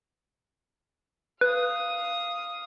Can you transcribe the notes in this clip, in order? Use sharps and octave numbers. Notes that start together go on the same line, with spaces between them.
B4 F5 D#6